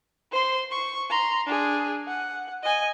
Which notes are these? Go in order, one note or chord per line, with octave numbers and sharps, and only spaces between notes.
C5 C6
C#6
A#5 C6
D4 G#4
F#5
D#5 G#5